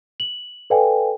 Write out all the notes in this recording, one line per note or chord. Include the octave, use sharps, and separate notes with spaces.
F#7
A4 B4 D5 F5 G5 G#5